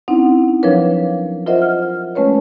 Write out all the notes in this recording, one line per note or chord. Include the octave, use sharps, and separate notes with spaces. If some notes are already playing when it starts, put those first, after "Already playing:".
C4 C#4 D#4 E4 F#5
F3 F#3 D4 A#4 B4 C#5
F4 A#4 C5 D#5 E5 F#5
F6
G#3 A3 C#4 B4 C#5